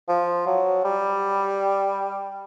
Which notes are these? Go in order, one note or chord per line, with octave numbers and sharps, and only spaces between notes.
F3
F#3
G3